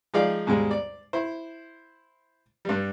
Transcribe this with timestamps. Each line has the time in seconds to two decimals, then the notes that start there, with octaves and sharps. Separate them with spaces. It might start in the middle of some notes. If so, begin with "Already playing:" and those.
0.14 F3 G#3 D#4 G#4 D5 F5
0.47 D#2 G#2 B2 G3 G#3
0.71 D5
1.13 E4 C5
2.65 G2 G3